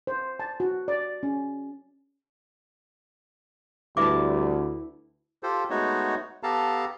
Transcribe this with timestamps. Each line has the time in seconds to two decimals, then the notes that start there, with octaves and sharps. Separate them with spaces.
0.07 C5
0.40 A5
0.60 F#4
0.88 D5
1.23 C#4
3.97 D2 G3 E4 B4 E5 A5 D6
5.43 F4 G4 A4 C5
5.70 G#3 A3 B3 D#4 F#4 C#5
6.43 B3 G4 A4 F5 A5 A#5